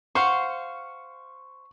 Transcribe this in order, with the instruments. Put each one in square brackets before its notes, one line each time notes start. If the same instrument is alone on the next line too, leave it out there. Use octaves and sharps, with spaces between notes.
[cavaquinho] C5 F5 F#5 [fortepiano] C#6